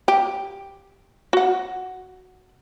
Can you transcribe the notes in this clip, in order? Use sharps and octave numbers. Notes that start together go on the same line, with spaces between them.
G4
F#4 F#5